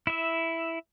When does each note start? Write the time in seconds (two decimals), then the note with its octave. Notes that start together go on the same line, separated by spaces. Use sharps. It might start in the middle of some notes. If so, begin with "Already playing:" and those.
0.07 E4 E5